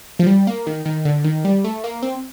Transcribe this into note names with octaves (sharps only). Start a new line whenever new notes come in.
F3
G3
A#3
D#3
D#3
D3
D#3
G3
A3
A#3
C4